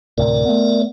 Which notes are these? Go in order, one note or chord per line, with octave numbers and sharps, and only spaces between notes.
D2 A2 C3 A#4 D5
A3 B3